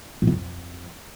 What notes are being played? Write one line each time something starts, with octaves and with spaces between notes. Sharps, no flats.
A2
C#3
F2